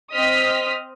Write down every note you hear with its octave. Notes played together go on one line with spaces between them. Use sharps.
C4 D#5 D#6 F6 B6